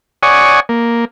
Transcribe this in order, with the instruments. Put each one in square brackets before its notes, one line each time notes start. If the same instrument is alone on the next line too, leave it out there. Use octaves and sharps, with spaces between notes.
[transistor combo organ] C#5 D5 F#5 G#5 C#6 D#6
A#3